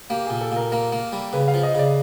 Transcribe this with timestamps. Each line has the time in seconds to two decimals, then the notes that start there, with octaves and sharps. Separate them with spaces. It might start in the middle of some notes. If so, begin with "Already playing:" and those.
0.10 A#3 G4
0.26 A#2 G#4
0.41 A4
0.52 A#2 A#4
0.72 A#3 A#4
0.92 A#3
1.13 G3
1.33 C#3 B4
1.48 F5
1.54 F3
1.63 D#5
1.75 C#3 D5